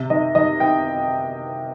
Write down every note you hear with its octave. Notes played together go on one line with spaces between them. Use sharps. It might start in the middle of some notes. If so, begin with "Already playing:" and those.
Already playing: C3
D#3 D#5
D#3 D#5
D#3 G5